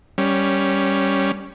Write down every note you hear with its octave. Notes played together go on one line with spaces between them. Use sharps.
G3 C#4